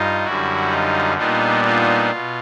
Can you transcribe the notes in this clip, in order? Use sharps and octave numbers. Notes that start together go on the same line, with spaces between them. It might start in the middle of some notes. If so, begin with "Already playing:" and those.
Already playing: G2 D#4 F4
F#2 D3 G3 E4 F#4
D#4 F4
A#2 G3 B3 D4 D#4 F4
D#4 F4
B2